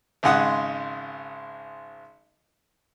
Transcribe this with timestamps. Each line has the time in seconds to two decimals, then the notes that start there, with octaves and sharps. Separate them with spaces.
0.23 G#1 C#3 G#3 F#5 D#6